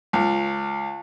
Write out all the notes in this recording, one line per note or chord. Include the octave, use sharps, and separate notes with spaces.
C#2